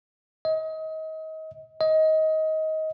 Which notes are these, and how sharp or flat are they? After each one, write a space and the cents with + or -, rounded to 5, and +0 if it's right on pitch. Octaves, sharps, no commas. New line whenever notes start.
D#5 +30
D#5 +20